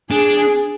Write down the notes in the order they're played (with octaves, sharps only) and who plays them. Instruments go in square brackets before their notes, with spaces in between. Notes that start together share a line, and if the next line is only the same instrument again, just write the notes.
[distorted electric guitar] D4 [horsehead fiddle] G#4